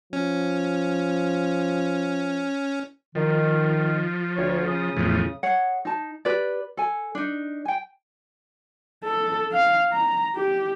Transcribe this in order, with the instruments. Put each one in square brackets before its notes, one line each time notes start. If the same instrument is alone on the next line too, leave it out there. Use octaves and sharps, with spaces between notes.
[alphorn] F3 [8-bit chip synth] C#4
[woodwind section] D#3 [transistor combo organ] F3
[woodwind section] D2 C#5
C#3 D#6
[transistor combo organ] E2 A2 F3
[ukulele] G#4 C#5 F#5
D#4 A5
G4 B4 D5
A4 G#5
D4 D#4
G5 G#5
[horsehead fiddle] A4
F5
A#5
G4